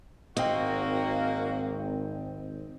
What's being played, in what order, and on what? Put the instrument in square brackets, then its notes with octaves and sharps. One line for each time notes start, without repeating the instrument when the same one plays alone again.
[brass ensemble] G#1 [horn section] A#3 F#4 [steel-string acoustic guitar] C4 [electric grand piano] D#5 G5